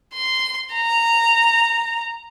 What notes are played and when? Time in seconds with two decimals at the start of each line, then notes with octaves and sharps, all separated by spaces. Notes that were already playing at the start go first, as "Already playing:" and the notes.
0.14 C6
0.74 A#5